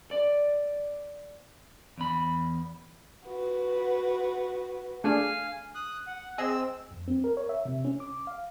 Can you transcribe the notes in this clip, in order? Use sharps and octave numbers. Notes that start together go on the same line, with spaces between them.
D5
E2 B5
F#4 B4
A3 D4 G#4 F5 G#5
D#6 F#6
F#5
C4 G#4 D#5 E6
F2
C4
A#4
C#5
E5
C3
C#4
D6
F5